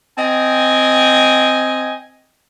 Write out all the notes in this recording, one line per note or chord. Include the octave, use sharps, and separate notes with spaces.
C4 D#5 G5 G#5